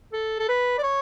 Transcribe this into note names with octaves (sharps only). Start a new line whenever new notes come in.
A4
A4
B4
D5
C#5